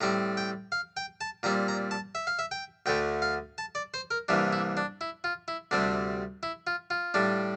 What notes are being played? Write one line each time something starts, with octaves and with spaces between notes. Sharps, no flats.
A2 G3 C4 A#5
G5
F5
G5
A5
A#2 G3 C4 A#5
A#5
A5
E5
F5
E5
G5
D2 D3 A3 G5
F5
A5
D5
C5
A#4
C2 C3 E3 A#3 D4
E4
D4
E4
F4
E4
D2 C3 G3 C4 D4
E4
F4
F4
A2 G3 D4